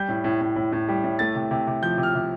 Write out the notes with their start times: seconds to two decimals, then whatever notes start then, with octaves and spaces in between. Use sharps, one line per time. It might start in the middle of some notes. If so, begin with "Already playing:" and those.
Already playing: G3 G6
0.09 A2
0.24 A2
0.41 A2
0.56 A2
0.72 A2
0.88 G3
1.04 A2
1.19 A3 A6
1.35 C3
1.51 C3
1.67 C3
1.82 F3 G6
1.98 C3
2.03 F6
2.15 C3